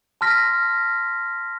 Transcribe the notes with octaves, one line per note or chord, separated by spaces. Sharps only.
A5 C6 F6 A#6 B6